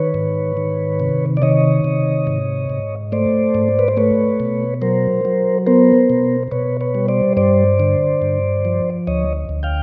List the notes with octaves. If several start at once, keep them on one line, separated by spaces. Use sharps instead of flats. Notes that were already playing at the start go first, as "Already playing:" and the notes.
Already playing: D#3 B4 C#5
G#2
D#3
C3
D5
D#3 C#5 D#5
C3
G#2
G#2
A3 C5 D5
G#2
B4
C5
A3 B4 C#5
B2
F#3 A#4 C5
F#3
B3 A#4 C5
B2
B2 B4 C#5
B4 C#5
G3
C5 D5
G2 C5 D5
D3
G2
F3
D2 C#5 D#5
D2
F5 G5